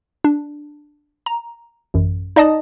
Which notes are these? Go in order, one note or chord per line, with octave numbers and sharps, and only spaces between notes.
D4
A#5
A1 F#2
D#4 D5 D#5 A5 D#6